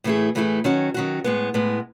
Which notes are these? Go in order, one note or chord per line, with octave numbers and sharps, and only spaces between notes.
A2 E3 A3 E4 G#4
A2 E3 A3 E4 G#4
D#3 F#3 C#4 F#4
D#3 F#3 C#4 F#4
A2 G#3 B3
A2 G#3 B3